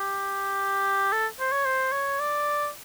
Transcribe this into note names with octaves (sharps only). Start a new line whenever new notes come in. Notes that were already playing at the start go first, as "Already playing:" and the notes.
Already playing: G4
A4
C5
C#5
C5
C#5
D5